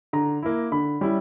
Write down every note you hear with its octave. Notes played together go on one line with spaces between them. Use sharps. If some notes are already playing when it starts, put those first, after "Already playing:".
D3 A#5
A#3 E4
D3 B5
G3 C#4 E4